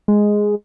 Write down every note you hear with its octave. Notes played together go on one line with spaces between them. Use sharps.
G#3